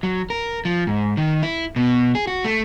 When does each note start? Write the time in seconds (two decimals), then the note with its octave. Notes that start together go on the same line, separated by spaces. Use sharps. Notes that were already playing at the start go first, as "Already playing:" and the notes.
0.03 F#3
0.30 A#4
0.65 F3
0.87 G#2
1.17 D#3
1.43 E4
1.76 B2
2.15 G#4
2.27 F#4
2.45 A3